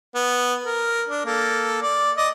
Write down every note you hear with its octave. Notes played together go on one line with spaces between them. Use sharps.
B3
A#4
D4
A#3 A4
D5
D5 D#5